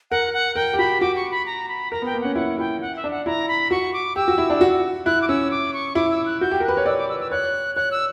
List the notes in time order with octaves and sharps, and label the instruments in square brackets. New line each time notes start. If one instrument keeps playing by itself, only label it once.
[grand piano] A#4 [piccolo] F#5
[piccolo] F#5
[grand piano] A#4 [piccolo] G5
[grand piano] G4
[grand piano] F#4 [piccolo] B5
[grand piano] F#4 [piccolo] D6
[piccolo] C#6
B5
A#5
B5
[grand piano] A#4 [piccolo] A#5
[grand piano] B3 [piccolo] G5
[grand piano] A#3
[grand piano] C#4 [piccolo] F#5
[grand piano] E4 [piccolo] F#5
[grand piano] E4 [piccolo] G5
[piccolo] F#5
E5
[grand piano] D4
[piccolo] F#5
[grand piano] E4 [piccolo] A#5
[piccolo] B5
[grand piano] F#4 [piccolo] C#6
[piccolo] D6
[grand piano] G4 [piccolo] E6
[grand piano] F#4
E4
D4
F#4
[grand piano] E4 [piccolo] F#6
[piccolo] D6
[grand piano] C#4 [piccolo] E6
[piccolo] D6
C#6
[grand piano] E4 [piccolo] D6
[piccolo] E6
F#6
[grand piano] F#4 [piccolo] G6
[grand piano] G4
A#4
[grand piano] B4 [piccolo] F#6
[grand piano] C#5
[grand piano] D5 [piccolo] E6
[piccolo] D6
E6
E6
[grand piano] C#5 [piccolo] F#6
[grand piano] C#5 [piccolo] F#6
[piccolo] E6